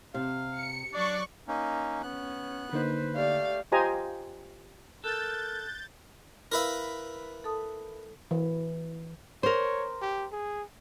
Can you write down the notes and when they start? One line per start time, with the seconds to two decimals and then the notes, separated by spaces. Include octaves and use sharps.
0.14 C3 F5
0.56 C#7
0.94 F#3 D4 D5 C#6 F#6
1.48 A#3 C#4 D#4
2.03 B3 C#4 F#6
2.73 D3 A#3 D#4 B4 C5
3.16 A3 G4 D5 F5
3.72 F4 G4 C5 D#5 G#5 A#5
5.04 A4 A#4 F#6 G6 A6
6.52 E4 A#4 B4 E5 F5
7.44 A4 A5 D#6
8.31 E3
9.43 A#4 C5 C#5
10.02 G4
10.32 G#4